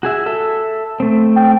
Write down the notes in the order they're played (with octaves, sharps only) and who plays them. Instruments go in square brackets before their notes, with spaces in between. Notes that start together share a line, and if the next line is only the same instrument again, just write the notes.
[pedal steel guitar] F#4 G#4 E5
A4 E5
A3 C4
[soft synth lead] G5